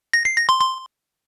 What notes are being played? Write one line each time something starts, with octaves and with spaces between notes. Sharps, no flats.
A#6
C7
A#6
C6
C6